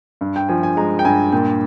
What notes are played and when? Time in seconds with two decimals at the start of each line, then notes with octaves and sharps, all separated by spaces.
0.21 G2
0.36 G5
0.49 F3 G#5
0.63 G#5
0.77 G#3 A#5
0.99 G5
1.05 G2 G#5
1.33 A#2 G5